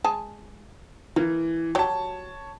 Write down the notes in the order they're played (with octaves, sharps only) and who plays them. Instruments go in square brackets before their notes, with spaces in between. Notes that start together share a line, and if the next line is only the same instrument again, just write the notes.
[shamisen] G#3 G#5 A5
[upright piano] E3 [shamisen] A#3
[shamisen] F#3 F#4 G4 [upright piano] C#5 A5